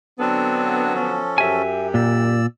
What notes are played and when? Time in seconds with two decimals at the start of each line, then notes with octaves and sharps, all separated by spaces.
0.20 D3 F#3 B3 C4 D4 A4
0.94 F3 C#4 A4
1.38 F#2 G4 E5 G#5
1.94 A#2 D5 E6